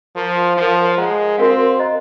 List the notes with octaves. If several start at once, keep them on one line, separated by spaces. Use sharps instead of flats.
F3 A#4 F5 A#5 C#6
F3 A#4 C#5 F#5
G#3 C5 F#5 A#5
C4 F#4 A#4 F5
C5 D#5 A#5